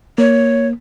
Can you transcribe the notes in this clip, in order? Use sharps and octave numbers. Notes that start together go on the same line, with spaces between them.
A#3 C#5